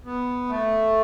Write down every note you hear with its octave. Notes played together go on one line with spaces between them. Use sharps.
B3
A3